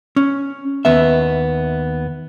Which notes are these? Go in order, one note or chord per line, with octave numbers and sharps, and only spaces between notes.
C#4
D#2 B3 E5